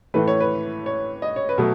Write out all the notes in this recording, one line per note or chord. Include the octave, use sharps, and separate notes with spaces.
A2 E3 A3 B4
C#5
B4
C#5
D#5
C#5
B4
B2 F#3 A3